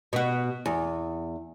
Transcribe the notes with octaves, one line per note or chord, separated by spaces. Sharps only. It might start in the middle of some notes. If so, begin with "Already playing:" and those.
B2 F#4
E2